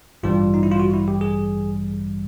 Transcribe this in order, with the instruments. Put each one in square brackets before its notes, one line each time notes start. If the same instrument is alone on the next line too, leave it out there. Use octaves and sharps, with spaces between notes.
[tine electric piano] A1 G2 E3 G3 F4
D#4
E4
F4
F#4
E4
G4
G#4